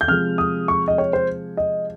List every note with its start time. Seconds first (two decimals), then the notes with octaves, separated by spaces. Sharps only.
0.01 G6
0.07 C3 F3 G#3 F6
0.38 D#6
0.68 C#6
0.88 D#5
0.98 C#5
1.13 C5
1.57 D#5